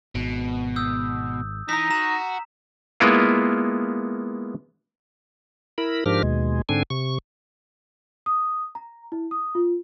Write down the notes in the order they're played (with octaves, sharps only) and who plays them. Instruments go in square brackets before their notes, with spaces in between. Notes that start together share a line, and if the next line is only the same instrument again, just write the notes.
[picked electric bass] G#1 [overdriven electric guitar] B2
[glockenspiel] D#6 E6 G6
[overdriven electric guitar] E3 [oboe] D#4 [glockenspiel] A#5 B6
[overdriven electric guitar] F#4 [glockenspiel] A#5 E7
[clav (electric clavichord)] G#3 A#3 B3 E4 F4
[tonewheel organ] E4 A#4 B5
G#2 F3 D4 G4 A#4 F6
D#2 B2 G#3
G#2 D3 C4 D4 G#5
C3 C#6
[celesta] D#6
A#5
E4
D#6
F4